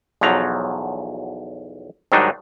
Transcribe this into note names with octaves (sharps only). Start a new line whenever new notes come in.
B1 E2 F3 F#3 A#5
G#2 D#3 F#3 G3 D4 D#4